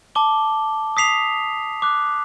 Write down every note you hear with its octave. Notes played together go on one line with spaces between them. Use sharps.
A5 D6 G7
D#6 B6 C7 F7
D6 F#6